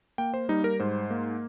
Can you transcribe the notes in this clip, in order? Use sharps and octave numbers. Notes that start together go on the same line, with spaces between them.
A#3 G5
C5
G3 D#4
A#4
G#2 C5
A#3